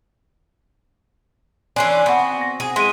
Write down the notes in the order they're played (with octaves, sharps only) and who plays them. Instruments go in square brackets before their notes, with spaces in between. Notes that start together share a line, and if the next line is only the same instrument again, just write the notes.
[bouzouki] E3 C#4 D4 [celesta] G#5 C7 [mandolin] C6
[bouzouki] B3 [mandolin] C4 F#4
[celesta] A#6
[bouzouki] G#4
[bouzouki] G#3 E4 [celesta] C6 D#7